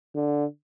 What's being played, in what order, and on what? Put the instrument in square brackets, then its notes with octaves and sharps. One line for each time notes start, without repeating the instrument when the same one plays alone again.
[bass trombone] D3